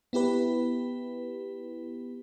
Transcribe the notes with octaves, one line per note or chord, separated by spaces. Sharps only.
B3 E4 G4 B4